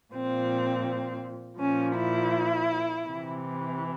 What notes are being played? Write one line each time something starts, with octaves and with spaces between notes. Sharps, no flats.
A#2 F3 C4
A#2 F3 C#4
E4
C3 E3